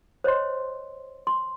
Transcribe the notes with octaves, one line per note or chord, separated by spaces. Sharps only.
C5 C#5 D#5 C6
C6